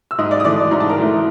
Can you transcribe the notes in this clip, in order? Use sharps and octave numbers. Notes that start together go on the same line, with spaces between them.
E6
G#2 D#5 D#6
D5 D6
D#6
E3 A3 D5 D6
G#2 A#5
A5
A#4 A#5
E3 A3